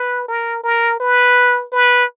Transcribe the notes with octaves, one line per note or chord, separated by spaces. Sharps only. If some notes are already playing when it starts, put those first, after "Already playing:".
Already playing: B4
A#4
A#4
B4
B4